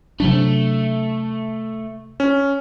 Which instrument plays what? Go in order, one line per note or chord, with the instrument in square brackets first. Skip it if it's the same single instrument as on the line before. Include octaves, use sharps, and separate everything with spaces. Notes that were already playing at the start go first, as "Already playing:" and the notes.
[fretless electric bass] C3 F#3 D4 [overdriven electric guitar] A3
[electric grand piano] C#4